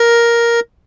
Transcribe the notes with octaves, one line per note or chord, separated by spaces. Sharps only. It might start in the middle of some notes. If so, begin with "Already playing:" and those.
Already playing: A#4